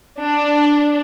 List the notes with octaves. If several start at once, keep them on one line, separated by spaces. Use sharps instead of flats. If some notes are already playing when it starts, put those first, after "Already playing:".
D4